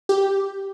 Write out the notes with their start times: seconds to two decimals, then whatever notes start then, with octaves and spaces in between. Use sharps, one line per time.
0.09 G4